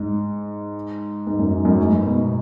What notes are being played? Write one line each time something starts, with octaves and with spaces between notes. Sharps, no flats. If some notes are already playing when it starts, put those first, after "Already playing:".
Already playing: G#2
G#2
F#2
G#2
F#2 A2
G#2
G#2
G#2 B2
B2